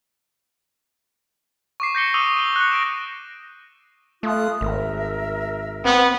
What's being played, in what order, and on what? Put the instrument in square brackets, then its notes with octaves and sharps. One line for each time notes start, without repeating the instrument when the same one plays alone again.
[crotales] C#6 D6 C7
G6 A#6 C#7 G7
C#6 D#6 E6 D#7 G7
G7
F#6 C#7
A#6 D7 E7
[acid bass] A3 [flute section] F4 D#6 F#6
[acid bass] G#1 [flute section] A#4 E5
[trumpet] B3 [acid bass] C4